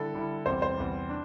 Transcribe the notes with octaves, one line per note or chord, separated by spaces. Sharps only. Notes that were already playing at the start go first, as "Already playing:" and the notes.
Already playing: D3 G3 E4 A4
D3 G3 E4
E2 C3 G3 C5
C5
E2 C3 G3
D4